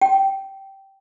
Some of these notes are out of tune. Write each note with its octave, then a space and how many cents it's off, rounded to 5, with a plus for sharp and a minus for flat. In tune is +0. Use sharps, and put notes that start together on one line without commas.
G5 -10